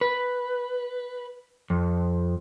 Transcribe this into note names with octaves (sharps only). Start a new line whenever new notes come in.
B4
F2